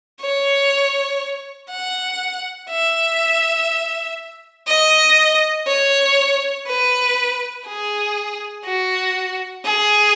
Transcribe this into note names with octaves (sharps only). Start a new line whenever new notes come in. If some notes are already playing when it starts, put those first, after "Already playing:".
C#5
F#5
E5
D#5
C#5
B4
G#4
F#4
G#4